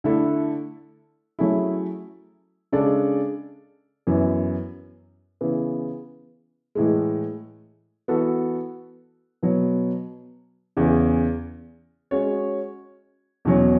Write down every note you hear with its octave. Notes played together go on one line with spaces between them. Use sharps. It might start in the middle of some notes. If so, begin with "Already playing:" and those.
D3 A3 E4 A4
F#3 A3 C#4 E4 G#4
C#3 G#3 D4 A4 D5
F#2 E3 B3
C#3 E3 B3
A2 E3 G#3
E3 B3 F#4 A4
B2 F#3 B3
E2 C#3 E3
G#3 C#4 F#4 C#5
E2 B2 F#3 C#4